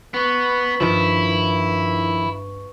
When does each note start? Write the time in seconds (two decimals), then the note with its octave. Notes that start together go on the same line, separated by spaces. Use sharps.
0.14 B3 B4 C#6
0.80 G2 D#3 F3 E4